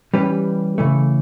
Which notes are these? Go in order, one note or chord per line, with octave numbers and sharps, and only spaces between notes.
E3 G3 C#4 G4 B4
C#3 E3 A3